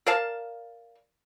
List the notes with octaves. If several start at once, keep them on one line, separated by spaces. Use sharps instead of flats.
A#4 D5 F5 A5